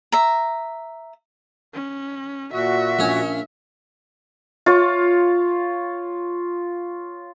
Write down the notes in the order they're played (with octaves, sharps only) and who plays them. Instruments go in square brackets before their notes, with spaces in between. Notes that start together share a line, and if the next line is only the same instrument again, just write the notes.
[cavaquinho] E5 A#5
[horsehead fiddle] C#4
[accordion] A#2 F#4 [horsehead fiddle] E5
[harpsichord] A#1 C#4 C#5
[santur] F4 C#5